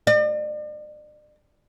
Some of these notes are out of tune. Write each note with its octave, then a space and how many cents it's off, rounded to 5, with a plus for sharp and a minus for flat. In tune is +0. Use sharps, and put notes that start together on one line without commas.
D5 +45